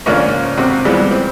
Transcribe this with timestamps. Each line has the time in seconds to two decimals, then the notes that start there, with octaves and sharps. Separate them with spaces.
0.06 G#2 C#3 F3 A#3 C#4 D4
0.57 C3 C4 F#4
0.85 E3 F3 G3 G#3 B3
1.11 C4